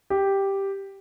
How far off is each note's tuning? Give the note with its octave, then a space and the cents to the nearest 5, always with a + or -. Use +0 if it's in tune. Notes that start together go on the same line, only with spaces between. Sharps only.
G4 +0